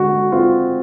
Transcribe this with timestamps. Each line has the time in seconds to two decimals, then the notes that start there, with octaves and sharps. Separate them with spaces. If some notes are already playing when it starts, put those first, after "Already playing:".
Already playing: D3 G#3 F#4
0.32 C4 F4